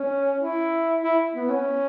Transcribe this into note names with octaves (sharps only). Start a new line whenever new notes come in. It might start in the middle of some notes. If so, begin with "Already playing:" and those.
Already playing: C#4
E4
E4
B3
C#4